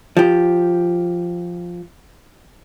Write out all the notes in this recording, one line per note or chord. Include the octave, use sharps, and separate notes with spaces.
F3 G4